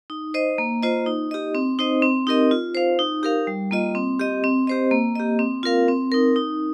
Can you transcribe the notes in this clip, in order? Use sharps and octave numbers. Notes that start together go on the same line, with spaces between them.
D#4
C5 D#5
A#3
F4 C5 D#5
D#4
G4 D#5
C4
D#4 C5 D#5
C4
D#4 G4 A#4 D#5
F4
C5 F5
D#4
G4 A#4 F5
G3
A#3 F4 D#5
C4
G4 D#5
C4
G4 C5 D#5
A#3
G4 D#5
C4
F4 A#4 F5
C4
D#4 A#4
D#4